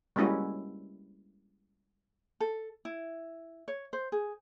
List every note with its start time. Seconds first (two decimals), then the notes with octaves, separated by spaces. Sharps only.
0.16 G3 G#3 A#3 C#4 E4 F#4
2.40 A4
2.85 E4
3.68 C#5
3.93 C5
4.12 G#4